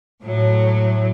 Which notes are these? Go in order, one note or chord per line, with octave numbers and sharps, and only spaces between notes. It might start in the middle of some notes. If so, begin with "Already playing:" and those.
A2 F#3